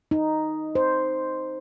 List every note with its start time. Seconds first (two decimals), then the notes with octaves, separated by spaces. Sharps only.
0.11 D#4
0.75 C5